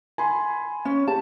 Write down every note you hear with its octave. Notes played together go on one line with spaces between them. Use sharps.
G#5 B5 C6
C#4
G4 A5